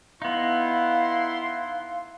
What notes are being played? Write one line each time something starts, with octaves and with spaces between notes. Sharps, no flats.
B3 D#4 E4 F5 C6